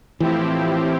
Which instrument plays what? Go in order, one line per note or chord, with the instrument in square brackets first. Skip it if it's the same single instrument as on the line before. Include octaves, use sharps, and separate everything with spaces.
[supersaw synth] A2 F3 C4 E4 G4 [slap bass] E3